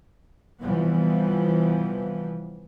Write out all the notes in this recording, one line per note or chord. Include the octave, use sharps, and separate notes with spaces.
C3 E3 F3 G3 B3